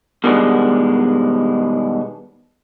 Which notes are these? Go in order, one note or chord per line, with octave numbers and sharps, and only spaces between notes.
B2 D#3 G3 G#3 B3 D4